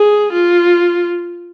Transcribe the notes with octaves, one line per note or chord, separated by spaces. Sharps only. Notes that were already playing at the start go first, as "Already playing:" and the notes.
Already playing: G#4
F4